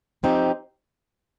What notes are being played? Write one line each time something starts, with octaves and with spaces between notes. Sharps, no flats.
F3 C4 D#4 G4